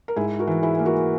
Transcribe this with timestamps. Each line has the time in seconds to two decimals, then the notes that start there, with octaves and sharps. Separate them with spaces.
0.08 A#4
0.16 G#2 E4 G#4
0.39 F#4 A#4
0.47 E3
0.63 E4 G#4
0.79 A#3
0.86 F#4 A#4